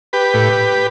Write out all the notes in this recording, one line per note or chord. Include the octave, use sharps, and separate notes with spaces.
G4 B4
A2